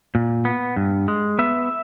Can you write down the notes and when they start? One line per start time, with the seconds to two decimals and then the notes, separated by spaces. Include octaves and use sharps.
0.15 A#2
0.45 B3
0.76 G2
1.08 G#3
1.39 B3 E5